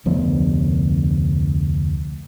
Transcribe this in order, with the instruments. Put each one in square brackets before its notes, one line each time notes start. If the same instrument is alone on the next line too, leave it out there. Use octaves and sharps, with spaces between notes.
[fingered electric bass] F1 D2 F3 B3